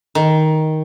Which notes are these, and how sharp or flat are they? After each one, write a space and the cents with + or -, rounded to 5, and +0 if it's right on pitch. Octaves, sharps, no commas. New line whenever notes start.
D#3 +10